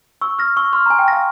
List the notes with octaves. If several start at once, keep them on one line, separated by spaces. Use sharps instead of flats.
C#6 E6
F6 A#6
C#6 E6
C6 F6
G#5 A#5
G5
F5 A#6